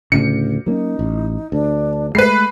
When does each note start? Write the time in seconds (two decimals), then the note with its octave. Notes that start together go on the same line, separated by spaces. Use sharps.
0.12 D2 A2 C#3 C#7
0.66 F#3 A#3 C#4 D#4
0.99 A1
1.52 D2 D4
2.15 G#3 A3 B4 B5 C7